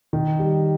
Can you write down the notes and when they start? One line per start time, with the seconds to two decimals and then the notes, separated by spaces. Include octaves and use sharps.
0.13 D#3
0.39 G3